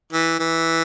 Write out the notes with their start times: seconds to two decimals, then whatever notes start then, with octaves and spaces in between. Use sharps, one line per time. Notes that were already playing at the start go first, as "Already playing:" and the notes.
0.13 E3
0.39 E3